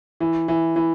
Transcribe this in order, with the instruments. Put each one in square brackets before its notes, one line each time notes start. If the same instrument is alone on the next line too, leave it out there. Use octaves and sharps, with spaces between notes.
[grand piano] E3
E3
E3